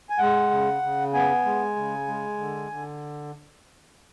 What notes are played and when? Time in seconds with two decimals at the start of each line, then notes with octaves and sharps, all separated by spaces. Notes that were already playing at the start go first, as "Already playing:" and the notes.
0.10 G#5
0.19 G#3 F#5
0.50 C#3
0.82 C#3
1.13 B3 G#5
1.45 G#3
1.76 C#3
2.07 G#3
2.38 D3
2.70 D3